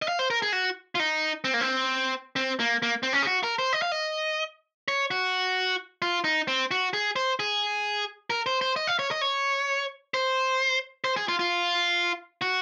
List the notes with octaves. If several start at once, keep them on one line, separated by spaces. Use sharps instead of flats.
D#5
F5
C5
A#4
G#4
F#4
F4
D#4
C4
A#3
C4
C4
A#3
A#3
C4
C#4
G#4
F#4
A#4
C5
D#5
F5
D#5
C#5
F#4
F4
D#4
C4
F#4
G#4
C5
G#4
A#4
C5
C5
D#5
F5
C#5
D#5
C#5
C5
C5
G#4
F4
F4
F#4